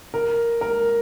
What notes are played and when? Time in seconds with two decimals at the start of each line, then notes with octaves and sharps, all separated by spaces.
0.14 A#4
0.61 A#4